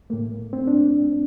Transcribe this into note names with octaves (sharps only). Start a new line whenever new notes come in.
A2 A3 A#3
C4
D4